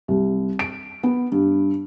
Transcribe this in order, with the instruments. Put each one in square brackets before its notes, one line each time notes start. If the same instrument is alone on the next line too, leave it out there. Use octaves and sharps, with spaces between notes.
[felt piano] C2
D7
B3
G2